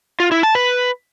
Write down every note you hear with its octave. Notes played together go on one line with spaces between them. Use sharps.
F4
E4
A5
B4